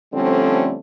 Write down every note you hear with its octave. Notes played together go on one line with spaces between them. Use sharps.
D3 F3 G3 A3 C4 C#4